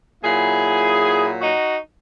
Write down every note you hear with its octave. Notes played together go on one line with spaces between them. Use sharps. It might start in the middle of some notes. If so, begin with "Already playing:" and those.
A#2 F#3 E4 G#4
D#4 F#4